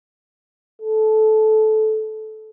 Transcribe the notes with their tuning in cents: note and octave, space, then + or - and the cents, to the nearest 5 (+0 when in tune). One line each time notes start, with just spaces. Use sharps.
A4 -20